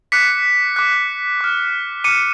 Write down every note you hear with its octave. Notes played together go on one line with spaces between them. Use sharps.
D6 F#6 B6 C#7
D6 F#6
D6 F6
D6 F6 C#7 D#7